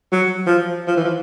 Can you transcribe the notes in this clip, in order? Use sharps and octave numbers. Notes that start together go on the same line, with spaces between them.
F#3
F3
F3
E3
F3